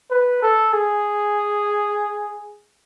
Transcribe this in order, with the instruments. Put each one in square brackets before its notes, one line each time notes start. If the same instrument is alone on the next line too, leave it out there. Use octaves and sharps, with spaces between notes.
[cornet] B4
A4
G#4